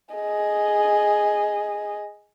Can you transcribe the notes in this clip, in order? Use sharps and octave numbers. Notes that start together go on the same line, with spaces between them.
G#4 D#5